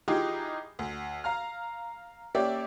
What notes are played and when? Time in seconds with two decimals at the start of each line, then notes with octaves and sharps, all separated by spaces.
0.08 E3 D#4 F4 G4 G#4
0.79 D2
1.24 F5 A#5 F6
2.35 A#3 C#4 G4 D5 E5